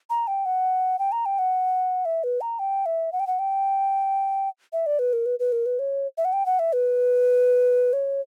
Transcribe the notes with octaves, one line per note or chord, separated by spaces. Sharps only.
A#5
G5
F#5
G5
A#5
G5
F#5
E5
B4
A#5
G5
E5
F#5
G5
F#5
G5
E5
D5
B4
A#4
B4
B4
A#4
B4
C#5
E5
F#5
G5
F#5
E5
B4
C#5